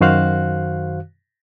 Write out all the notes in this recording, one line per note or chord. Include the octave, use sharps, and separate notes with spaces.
F#2 D#3 F#4 C5 F5 F#6